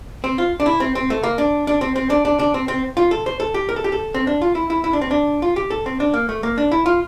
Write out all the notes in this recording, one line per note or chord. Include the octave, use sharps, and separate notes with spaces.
C4
F4
D4
E4
C4
C4
A3
A#3
D4
D4
C4
C4
D4
D4
D4
C4
C4
F4
A4
C5
A4
G4
A#4
A4
G4
A4
C4
D4
F4
E4
E4
E4
D4
C4
D4
F4
G4
A4
C4
D4
A#3
A3
A#3
D4
E4
F4